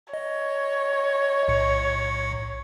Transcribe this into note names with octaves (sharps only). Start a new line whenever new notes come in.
C#5 D#5
B1 A2 C#7